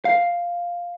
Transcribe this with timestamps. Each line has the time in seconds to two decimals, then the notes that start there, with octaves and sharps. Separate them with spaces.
0.05 F5